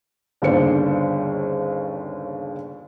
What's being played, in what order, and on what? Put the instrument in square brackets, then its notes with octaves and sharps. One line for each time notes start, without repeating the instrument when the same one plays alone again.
[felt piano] G1 D#2 C#3 D4 C5 C#7